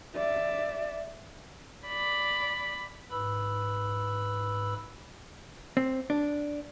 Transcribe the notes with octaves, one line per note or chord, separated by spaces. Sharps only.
D5 E5
D5 B5
G#2 B4 B5 E6
C4
D4